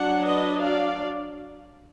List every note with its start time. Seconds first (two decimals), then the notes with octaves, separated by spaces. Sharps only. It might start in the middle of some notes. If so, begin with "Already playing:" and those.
Already playing: F#3 D4 F#5
0.25 B4 D#5
0.61 D5 F5